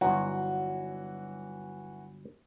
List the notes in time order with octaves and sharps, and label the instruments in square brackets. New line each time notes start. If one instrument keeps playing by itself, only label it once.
[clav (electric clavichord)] G1 F#3 [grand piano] E3 F#4